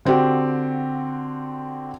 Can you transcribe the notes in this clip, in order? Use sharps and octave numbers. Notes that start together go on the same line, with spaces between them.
D3 C4 F#4 G4